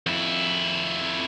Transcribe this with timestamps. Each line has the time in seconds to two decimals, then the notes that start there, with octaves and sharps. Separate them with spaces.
0.07 F2 E4